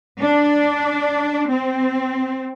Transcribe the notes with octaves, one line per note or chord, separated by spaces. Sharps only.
D4
C4